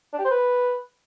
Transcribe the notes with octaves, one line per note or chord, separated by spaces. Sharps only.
D4
G4
C5
B4